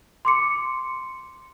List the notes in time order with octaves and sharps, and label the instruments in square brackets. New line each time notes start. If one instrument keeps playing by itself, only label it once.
[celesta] C6 D6 C#7